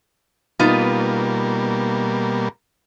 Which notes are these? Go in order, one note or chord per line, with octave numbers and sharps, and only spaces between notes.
B2 G3 A#3 B3 D#4 F4